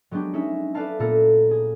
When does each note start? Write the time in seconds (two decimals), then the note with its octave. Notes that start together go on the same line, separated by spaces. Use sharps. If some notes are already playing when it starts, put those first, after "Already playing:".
0.11 F#3 G#3 B3 D4 G4
0.33 C#4 D#4 G#4 E5
0.74 A4 B4 D5 E5 F5 A5
0.99 A#2 B3 A4 A#4
1.51 G#4